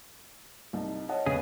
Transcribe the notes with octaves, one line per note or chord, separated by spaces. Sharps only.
C2 D#4 A5
C#5 D#5 F#5 A5
E1 C#3 B3 G#4